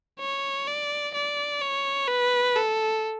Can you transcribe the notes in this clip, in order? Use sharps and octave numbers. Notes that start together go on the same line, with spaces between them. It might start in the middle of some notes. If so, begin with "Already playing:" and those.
C#5
D5
D5
C#5
B4
A4